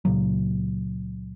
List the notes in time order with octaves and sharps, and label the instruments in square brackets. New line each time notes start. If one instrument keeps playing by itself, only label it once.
[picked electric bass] C#2 A#2 C#3 F#3